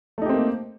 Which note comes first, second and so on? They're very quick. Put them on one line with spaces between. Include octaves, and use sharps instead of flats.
A3 D#4 G4 C4 A#3